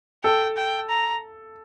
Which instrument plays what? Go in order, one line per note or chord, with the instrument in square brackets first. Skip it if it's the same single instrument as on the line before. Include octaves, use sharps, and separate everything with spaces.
[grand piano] A4 [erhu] G5
[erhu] G5
A#5